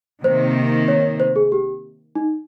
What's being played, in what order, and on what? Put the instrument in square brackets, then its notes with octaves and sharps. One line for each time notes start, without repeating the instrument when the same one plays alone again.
[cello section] C3 D#3 A#3 [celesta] C5
[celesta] C#5
C5
G#4
G4
D#4